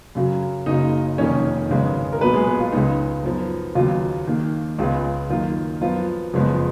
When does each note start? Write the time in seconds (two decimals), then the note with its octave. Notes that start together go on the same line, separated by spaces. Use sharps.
0.15 F#2 C#3 F#3
0.66 F#1 F#2 C#3 F#3 A#3 D#4 D#5
1.18 F1 F2 D#3 A#3 C#4 C#5
1.69 G#1 F#2 C#3 G#3 B3
2.12 A#4
2.21 B1 A#2 F#3 B3 B4
2.34 G#3 G#4
2.47 B3 B4
2.60 F4
2.72 C#2 C#3 G#3 B3 D#4
3.24 F#2 F3 B3
3.75 D#2 C#3 F#3 B3 F4
4.27 D#2 D#3 A#3
4.78 C#2 C#3 G#3 B3 F4
5.30 F#2 D#3 A#3 F4
5.81 F#2 F3 B3 F4
6.33 F#1 F2 F3 G#3 B3